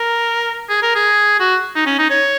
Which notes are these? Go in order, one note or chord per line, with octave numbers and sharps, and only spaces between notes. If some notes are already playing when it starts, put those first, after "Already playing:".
Already playing: A#4
G#4
A#4
G#4
F#4
D#4
C#4
D#4
C#5